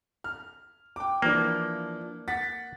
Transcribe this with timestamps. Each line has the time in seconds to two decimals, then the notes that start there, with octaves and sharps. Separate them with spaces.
0.24 F6
0.96 G5 D6
1.22 E3 F3 A#3 D4
2.28 F#5 A6 B6